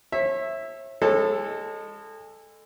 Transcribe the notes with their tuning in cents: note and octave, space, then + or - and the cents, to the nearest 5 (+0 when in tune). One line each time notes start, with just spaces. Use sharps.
C#5 -35 E5 +0
G#3 -30 A4 +0 C#5 -30